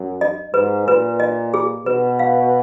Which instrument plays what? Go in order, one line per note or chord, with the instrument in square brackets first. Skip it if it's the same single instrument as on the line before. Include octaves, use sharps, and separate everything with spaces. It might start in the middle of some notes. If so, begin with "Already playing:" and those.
Already playing: [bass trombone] F#2
[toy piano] D#5
[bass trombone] G#2 [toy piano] B4
[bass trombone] A#2 [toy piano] B4
[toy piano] D#5
G#4
[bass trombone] B2 [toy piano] B4
[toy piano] F5